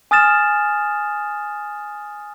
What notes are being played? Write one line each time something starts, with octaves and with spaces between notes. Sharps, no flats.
G#5 D#6 F6 A6 E7